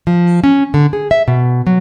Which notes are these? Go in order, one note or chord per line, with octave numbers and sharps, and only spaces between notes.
F3
C#4
D3
G#4
E5
B2
F#3